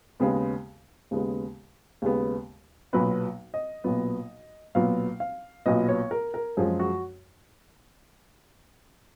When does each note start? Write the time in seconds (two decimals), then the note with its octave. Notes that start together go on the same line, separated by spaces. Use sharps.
0.20 D#2 C#3 G#3 B3
1.11 D#2 C#3 G#3 B3
2.02 D#2 C#3 G#3 B3
2.93 B1 A#2 F#3 B3 B4
3.54 D#5
3.84 B1 A#2 F#3 B3
4.75 B1 A#2 F#3 B3 F5
5.20 F5
5.66 B1 A#2 F#3 B3 D#5
5.88 C#5
6.11 A#4
6.34 A#4
6.57 F#2 F3 G#3 G#4
6.79 F#4